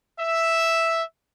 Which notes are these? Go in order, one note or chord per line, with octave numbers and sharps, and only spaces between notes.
E5